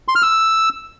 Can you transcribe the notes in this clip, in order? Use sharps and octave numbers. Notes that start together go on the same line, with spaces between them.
C6
F6
E6